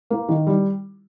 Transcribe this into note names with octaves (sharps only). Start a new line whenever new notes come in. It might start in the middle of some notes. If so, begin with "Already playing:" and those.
A#3
D#3
G3